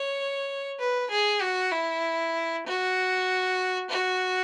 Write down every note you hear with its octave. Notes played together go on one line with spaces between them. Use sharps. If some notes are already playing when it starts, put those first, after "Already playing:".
Already playing: C#5
B4
G#4
F#4
E4
F#4
F#4